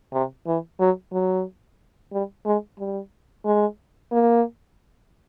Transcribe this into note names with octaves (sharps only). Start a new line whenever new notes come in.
C3
E3
F#3
F#3
G3
G#3
G3
G#3
A#3